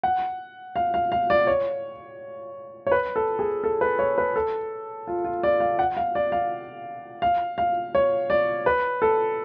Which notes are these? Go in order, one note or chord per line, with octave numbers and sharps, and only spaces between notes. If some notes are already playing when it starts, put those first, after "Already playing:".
F#5
F5
F5
F5
D5
C#5
C#5
B4
A4
G#4
A4
B4
C#5
B4
A4
F4
F4
D5
F5
F#5
F5
D5
F5
F5
F5
C#5
D5
B4
A4